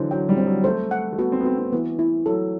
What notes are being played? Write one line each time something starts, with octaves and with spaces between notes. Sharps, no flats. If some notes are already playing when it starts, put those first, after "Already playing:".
Already playing: D3 E3 F#3 C5
F#3 G5
G3
C4
F#3
A3 C5
F#5
A3
B3 F#4
C4
B3
C4 F#4
C4
E3 B3
E4
F#3 A4